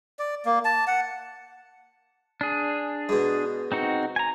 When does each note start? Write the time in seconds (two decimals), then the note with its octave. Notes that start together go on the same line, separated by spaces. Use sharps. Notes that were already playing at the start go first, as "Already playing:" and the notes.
0.19 D5
0.45 A#3
0.65 A5
0.87 F#5
2.41 D4 G#4
3.09 G#2 B2
3.72 C4 D#4 F#4
4.16 G#5 A#5